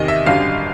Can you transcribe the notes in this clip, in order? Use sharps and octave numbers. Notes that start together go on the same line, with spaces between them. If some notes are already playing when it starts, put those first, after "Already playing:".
Already playing: E2 C3 D#3 D#5
E5
G#1 F#2 D3 G3 F5